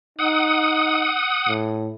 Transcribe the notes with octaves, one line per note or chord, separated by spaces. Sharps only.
D#4 F#5 D#6
A2